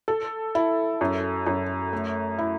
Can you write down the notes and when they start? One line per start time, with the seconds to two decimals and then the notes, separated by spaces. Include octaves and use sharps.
0.08 A4
0.55 E4
1.01 F#2
1.47 F#2
1.93 A3
2.38 E4